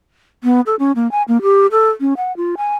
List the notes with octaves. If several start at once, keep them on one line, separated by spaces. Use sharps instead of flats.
B3
A4
C#4
A#3
G#5
A#3
G4
A4
C#4
F#5
F4
G#5